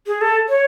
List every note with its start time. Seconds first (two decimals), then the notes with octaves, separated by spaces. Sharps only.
0.07 G#4
0.21 A4
0.49 C#5